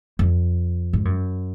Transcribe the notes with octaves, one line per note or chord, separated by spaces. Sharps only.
F2
G#2
F#2